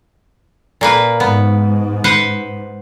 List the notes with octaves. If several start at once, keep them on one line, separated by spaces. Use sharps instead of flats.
A#2 A#3 B4
G#2 B3
B4 C5 F#5